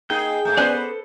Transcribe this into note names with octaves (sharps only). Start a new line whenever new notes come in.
A#3 D#4 G#4 G5 G6
G#2 G#3 A3 G6
B3 C#4 C5 D5 G#5 F#6
A4 B4